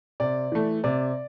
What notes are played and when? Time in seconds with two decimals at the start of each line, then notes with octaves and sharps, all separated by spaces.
0.20 C3 D5
0.52 E3 A3
0.84 C3 D5